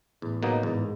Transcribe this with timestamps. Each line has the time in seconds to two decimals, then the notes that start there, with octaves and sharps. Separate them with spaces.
0.22 E2 A2
0.43 B2 F#3 A#3 D#4
0.63 E2 G#2